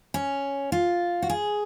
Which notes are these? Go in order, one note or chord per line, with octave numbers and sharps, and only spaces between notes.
C#4
F4
F#4
G#4